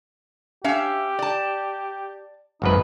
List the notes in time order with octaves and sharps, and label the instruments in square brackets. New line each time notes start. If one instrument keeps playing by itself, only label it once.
[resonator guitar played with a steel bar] C#4 E5 F5 [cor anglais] G4
[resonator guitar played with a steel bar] D5 A5
[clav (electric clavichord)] G#1 F#2 B4 [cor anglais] D#4